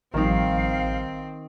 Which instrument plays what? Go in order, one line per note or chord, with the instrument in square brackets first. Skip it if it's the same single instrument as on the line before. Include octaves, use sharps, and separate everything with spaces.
[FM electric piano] A1 F3 G3 [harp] D#3 D#4 [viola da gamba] C4 [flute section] F5